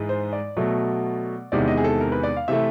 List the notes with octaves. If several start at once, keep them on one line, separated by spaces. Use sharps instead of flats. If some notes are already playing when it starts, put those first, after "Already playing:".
Already playing: G#2 E3 G#3
C5
D5
B2 F#3 A3
E2 C3 D#3 G#3 D5
D#5
G#4
A4
A#4
B4
D5
F5
C3 E3 A3 E5